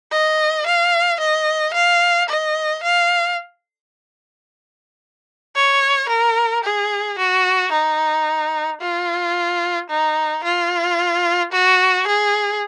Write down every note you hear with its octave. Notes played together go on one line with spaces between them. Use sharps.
D#5
F5
D#5
F5
D#5
F5
C#5
A#4
G#4
F#4
D#4
F4
D#4
F4
F#4
G#4